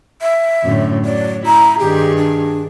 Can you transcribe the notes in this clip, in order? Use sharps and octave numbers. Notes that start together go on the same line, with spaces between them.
E5
F#2 A2 D3
F#3 D5
E4 A#5
G2 D#3 G4 G#4
D4